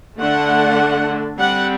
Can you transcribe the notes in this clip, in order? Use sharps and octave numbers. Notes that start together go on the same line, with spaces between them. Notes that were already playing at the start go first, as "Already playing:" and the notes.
D3 A3 D4 F#5
G3 C4 F#5